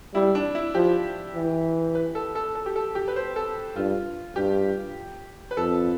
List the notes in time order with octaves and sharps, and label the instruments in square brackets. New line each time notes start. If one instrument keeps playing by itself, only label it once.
[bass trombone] G3 [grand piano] E4
[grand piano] D4
E4
[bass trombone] F3 [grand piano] G4
[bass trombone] E3
[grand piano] B4
A4
A4
A4
G4
A4
G4
B4
C5
A4
[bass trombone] G2 [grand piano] F4
[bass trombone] G2 [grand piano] G4
[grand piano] B4
[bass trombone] F2 [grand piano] A4